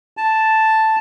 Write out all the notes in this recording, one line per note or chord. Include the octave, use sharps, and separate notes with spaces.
A5